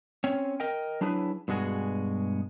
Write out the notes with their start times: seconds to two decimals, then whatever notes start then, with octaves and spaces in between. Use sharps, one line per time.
0.24 C4 C#4 C#5
0.60 A#4 D#5 G5
1.01 F#3 D4 E4 G#4 B4
1.48 G2 B2 G#3 F#4 G#4